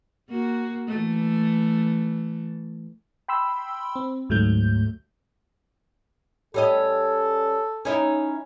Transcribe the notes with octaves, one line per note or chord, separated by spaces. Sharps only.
A#3 F#4
E3 A3
G5 B5 C6 E6
C4
D2 G#2 F#3 A3 G6
G3 C#4 A4 D#5
C#4 D#4 E4